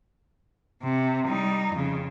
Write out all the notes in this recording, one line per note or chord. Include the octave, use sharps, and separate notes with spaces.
C3
G3 D#4
F2 C#3